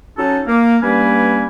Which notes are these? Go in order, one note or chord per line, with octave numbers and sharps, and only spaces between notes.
F#3 C#4 D#4 F#4 A4
A#3
G2 G3 A#3 C#4 B4 G#5